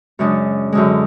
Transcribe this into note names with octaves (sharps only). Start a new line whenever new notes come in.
F#2 C#3 G#3 D4
F#2 D3 G#3